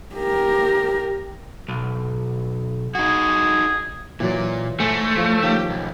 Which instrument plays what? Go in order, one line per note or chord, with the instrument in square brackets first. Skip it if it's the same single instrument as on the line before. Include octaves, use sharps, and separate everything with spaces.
[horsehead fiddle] G4 A#4
[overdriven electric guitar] B1
[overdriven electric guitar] D#4 F#4 [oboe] G#4
[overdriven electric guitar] A#2 [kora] E3 F#3 D5
[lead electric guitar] A3 [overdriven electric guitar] C5 G#5
[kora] F3 C#5
[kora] D#3 F3 C#4 [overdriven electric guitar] G4
[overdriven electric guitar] B1